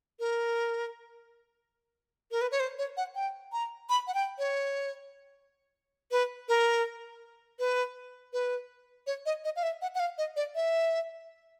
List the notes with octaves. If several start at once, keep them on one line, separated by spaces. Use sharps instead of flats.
A#4
A#4
B4
C#5
C5
C#5
F#5
G5
A#5
B5
F#5
G5
C#5
B4
A#4
B4
B4
C#5
D#5
D#5
F5
E5
F#5
F#5
F5
D#5
D5
E5